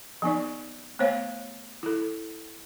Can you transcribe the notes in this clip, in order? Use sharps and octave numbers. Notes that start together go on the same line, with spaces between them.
F3 B3 D#4 D5
A3 B3 C5 C#5 F5
E4 A4